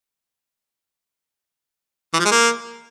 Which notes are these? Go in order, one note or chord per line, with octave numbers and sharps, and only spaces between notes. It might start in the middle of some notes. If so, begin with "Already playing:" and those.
E3
F3
G#3
A#3